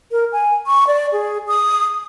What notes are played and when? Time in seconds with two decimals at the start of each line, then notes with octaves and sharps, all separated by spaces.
0.11 A#4
0.32 G#5
0.67 C#6
0.87 D5
1.12 G#4
1.48 D#6